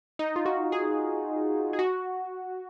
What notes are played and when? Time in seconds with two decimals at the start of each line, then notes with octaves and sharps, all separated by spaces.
0.19 D#4
0.36 F4
0.46 F#4
0.72 G#4
1.73 G#4
1.79 F#4